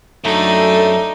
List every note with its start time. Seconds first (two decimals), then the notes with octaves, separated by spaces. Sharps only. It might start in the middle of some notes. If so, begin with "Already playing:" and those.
0.24 F#2 A3 D4 D#4 A4